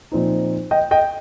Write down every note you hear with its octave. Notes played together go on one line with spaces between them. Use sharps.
A#2 F3 C4 D#4
D#5 G5
D#5 G5